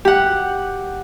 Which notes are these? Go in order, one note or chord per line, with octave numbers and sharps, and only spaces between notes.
G4 F#5